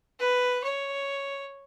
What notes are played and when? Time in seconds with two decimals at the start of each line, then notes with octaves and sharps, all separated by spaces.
0.19 B4
0.63 C#5